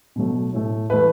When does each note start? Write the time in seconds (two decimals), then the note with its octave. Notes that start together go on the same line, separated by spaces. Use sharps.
0.16 B2 F#3 A3
0.53 A2 A3
0.90 E3 A3 B4